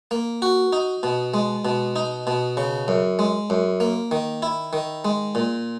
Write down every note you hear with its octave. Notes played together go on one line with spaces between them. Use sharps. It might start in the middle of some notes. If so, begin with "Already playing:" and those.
A#3
F#4
D#4
B2
G#3
B2
D#4
B2
C#3
F#2
G#3
F#2
A#3
D#3
E4
D#3
G#3
A#2